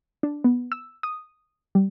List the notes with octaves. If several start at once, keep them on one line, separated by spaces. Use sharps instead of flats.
D4
B3
E6
D#6
G3